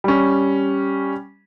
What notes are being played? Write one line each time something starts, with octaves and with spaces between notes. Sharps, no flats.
G3 C#4